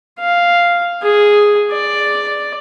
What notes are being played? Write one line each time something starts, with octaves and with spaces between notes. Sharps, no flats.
F5
G#4
D5